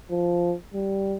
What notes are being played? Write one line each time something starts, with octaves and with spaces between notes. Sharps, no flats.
F3
G3